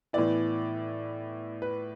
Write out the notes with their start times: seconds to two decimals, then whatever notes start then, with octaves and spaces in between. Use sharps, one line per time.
0.13 A2 E3 B3 E4 D5
1.62 B4